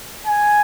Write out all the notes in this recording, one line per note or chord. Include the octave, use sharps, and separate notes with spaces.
G#5